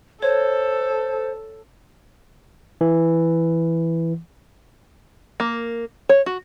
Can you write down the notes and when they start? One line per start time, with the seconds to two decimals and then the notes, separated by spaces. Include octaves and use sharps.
0.22 A4 C5 C#5
2.81 E3
5.40 A#3
6.09 C#5
6.26 F#4